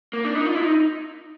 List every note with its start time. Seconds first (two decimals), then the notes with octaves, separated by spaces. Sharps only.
0.13 A#3
0.25 D4
0.35 D#4
0.46 F4
0.55 E4
0.62 D#4